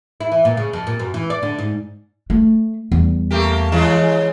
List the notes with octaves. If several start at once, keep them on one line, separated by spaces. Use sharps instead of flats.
E4
E3
A#2
C#3
F2
A#2
F#2
E3
D5
D3
G#2
A3
E2 G3
A3 A#3 G4
C#3 E3 G#3